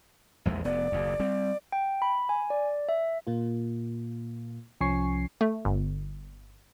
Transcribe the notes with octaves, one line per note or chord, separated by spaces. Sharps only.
A#1 E2 G#3
F1 B3 D5
F#1 D#2
G3 C4
G5
B5
G#5
D5
E5
A#2 A#3 F4
C2 F3 C#4 G#5 C#6 C7
A3
G1